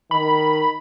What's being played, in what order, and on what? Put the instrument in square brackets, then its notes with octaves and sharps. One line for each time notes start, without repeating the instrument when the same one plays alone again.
[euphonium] D#3 [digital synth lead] B5